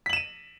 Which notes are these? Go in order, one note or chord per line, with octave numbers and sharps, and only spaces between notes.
B6 D#7 E7 F#7